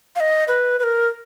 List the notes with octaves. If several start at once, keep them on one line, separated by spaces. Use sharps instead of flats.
F5
D#5
B4
B4
A#4